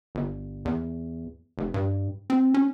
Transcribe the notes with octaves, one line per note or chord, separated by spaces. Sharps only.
G1
E2
F1
G2
C4
C#4